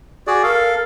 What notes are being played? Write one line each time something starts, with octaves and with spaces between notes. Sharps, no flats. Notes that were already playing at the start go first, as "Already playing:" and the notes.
F#4 G#4 D5
A4 A#4 F5